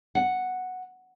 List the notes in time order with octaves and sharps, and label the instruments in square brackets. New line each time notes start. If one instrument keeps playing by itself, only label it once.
[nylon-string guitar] F#5